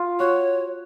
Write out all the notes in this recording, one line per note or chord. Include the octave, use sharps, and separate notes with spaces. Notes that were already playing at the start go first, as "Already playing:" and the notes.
Already playing: F4
F#4 C#5